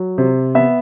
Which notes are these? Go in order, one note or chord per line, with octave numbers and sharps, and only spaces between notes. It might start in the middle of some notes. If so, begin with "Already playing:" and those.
Already playing: F#3
C3
B3 E5